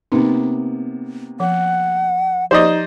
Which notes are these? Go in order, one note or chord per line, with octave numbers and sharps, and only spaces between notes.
C3 A#3 B3 D#4
F3 F#5
F3 D#4 G4 C5 D5 D#5